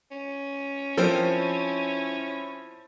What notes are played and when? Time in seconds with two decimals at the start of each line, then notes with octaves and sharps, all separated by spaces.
0.11 C#4
0.97 F3 C4 E4 A4 A#4 C5